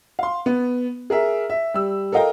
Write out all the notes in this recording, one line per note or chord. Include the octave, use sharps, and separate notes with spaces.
F5 C6
B3
G#4 A#4 E5
E5
G3 E6
A4 A#4 D#5 F5 G5 A#5